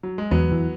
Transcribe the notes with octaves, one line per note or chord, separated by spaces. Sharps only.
F#3
G#3
E2 F#3 B3
E3